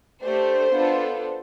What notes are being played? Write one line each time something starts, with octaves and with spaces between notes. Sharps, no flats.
A3 D4 G4 C5
B3 D4 F4 A4